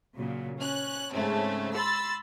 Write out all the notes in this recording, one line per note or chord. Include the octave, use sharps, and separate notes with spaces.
A#2 C#3 F#3
C#4 F#6
G#2 C#3 A3 C4 C#4
B5 C6 E6 A6